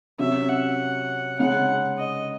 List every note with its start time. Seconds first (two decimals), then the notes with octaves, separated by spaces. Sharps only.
0.19 C3 F#3 C#4 E5
0.49 F#5
1.39 C#3 G#3 D#4 G#4 F#5
1.99 D#5